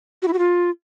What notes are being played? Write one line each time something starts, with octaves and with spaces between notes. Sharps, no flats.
F#4
E4
F#4
F4